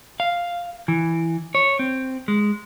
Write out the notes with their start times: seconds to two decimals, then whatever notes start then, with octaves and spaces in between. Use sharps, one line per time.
0.20 F5
0.88 E3
1.55 C#5
1.79 C4
2.28 G#3